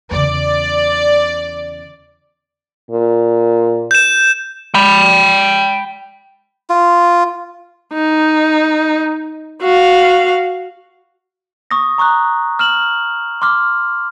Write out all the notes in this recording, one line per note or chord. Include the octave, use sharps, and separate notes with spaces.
E2 C#3 D5
A#2
G6 E7
G5 B5
F4
D#4
F#4 F5
C#6 D#6 A#6
A#5 C#6 D#6 F#6
F6 E7 F#7
C6 D6 F6